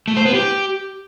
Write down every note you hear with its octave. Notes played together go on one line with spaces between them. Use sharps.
A3
C5
B3
G4